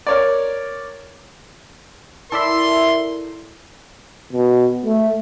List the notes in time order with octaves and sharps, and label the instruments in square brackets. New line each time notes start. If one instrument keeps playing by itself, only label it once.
[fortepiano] A#4 C#5 D5
[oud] E4 [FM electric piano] A4 D5 E5 [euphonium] A#4 [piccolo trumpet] C6
[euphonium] B2
A3